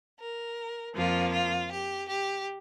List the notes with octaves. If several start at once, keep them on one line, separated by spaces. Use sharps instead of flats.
A#4
F2 F3 A#3 F4
F4
G4
G4